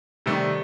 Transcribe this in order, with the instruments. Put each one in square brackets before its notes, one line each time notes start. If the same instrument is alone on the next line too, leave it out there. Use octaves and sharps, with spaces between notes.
[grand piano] C3 D#3 A3 [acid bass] G3